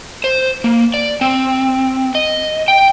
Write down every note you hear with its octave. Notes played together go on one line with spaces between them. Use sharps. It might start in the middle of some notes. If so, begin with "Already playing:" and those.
C5
A#3
D5
C4
D#5
G5